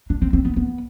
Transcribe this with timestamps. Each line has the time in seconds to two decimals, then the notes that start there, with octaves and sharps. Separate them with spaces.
0.10 D4
0.22 C4
0.33 C4
0.45 B3
0.56 B3